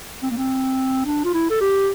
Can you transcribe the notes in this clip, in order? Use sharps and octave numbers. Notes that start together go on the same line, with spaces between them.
C4
A#3
C4
D4
F4
E4
A4
G4